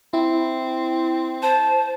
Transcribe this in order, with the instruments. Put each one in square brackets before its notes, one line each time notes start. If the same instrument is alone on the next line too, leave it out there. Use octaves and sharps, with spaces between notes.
[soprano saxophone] C4 [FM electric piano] E4
[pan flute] C5 [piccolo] A5